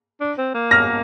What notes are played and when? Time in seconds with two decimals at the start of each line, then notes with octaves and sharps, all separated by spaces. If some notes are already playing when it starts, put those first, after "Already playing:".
0.21 D4
0.38 C4
0.54 A#3
0.71 F6 A#6